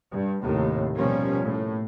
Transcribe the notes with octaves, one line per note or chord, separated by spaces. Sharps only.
G2
D#2 A2 C3
B2 F3 G3 A#3 C#4
A2